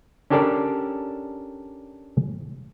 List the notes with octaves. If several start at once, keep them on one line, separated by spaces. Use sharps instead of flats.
C#4 D4 G4 A4 A#4 D5